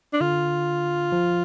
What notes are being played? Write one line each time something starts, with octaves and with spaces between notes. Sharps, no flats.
D4
D3 F4
F3